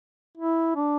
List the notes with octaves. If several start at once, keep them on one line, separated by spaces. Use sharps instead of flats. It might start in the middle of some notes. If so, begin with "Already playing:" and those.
E4
D4